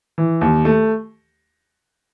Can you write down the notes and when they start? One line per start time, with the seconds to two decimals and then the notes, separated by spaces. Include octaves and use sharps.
0.18 E3
0.41 D#2
0.65 A3